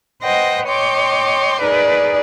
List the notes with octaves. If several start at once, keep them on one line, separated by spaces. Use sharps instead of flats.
B4 C5 D#5 F#5 G5 A#6
C#5 D#5 G5 C6 D6
D#4 G#4 A#4 B4 D5